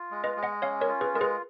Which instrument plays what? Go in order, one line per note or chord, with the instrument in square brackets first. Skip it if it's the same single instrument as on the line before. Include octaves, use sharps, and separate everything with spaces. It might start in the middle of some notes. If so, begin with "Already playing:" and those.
Already playing: [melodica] F4
G#3
[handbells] B4 D#5
[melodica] G#3
[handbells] D#5 F#5
[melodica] C#4 [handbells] C#5 F5
[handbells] A#4 C#5
[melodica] F4
[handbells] G#4 B4
[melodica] G#3 [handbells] A#4
[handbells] G#4 B4